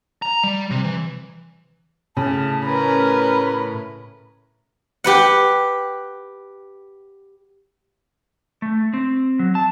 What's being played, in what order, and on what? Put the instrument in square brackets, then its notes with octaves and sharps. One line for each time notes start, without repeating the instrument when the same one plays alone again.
[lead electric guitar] A#5
G3
C3
E3
[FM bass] A2 [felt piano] C#3 [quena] A5
[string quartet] C#4 A#4 B4 [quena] B5
[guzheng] G4 B4 F#5
[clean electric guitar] A3
C4
F#3
A5